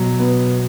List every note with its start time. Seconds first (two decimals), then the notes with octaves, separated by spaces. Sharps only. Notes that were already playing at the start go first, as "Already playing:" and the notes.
Already playing: B2 F#3
0.19 B3